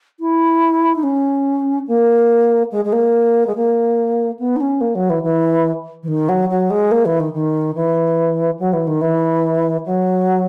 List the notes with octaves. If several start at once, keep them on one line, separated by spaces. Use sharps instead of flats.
E4
D#4
C#4
A#3
G#3
G#3
A#3
G#3
A#3
B3
D#4
C#4
A#3
F#3
E3
E3
E3
D#3
F#3
F#3
G#3
A#3
E3
D#3
D#3
E3
F#3
E3
D#3
E3
F#3